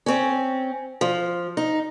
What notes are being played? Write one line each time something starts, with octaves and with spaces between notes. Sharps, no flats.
C4 C#4
F3
D#4